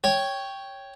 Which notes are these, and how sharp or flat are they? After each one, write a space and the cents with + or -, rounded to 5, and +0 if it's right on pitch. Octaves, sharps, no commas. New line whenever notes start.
C#5 +0 G5 +0